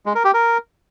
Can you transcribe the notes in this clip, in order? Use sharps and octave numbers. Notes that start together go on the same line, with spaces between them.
G#3
A#4
G4
A#4